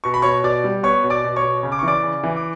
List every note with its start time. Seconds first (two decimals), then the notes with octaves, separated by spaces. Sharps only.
0.04 B2 C#6
0.14 B5
0.22 B2 C#5 C#6
0.44 B2 D5 D6
0.64 G3
0.83 B3 C#5 C#6
1.04 B2
1.10 D5 D6
1.24 B2
1.36 C#5 C#6
1.43 B2
1.63 C#3
1.72 D6
1.79 C#6
1.83 E3 D5 D6
2.03 C#3
2.24 E3
2.36 D6